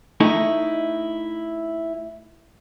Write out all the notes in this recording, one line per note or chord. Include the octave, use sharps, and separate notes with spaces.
A3 D#4 E4